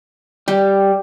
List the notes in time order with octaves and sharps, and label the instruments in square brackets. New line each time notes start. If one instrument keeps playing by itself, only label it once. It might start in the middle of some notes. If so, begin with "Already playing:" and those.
[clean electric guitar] G3 [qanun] G4